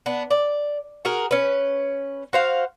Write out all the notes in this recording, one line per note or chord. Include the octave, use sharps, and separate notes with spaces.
B3 D4
D5
F#4 G#4 A#4
C#4 B4
F#4 C5 F5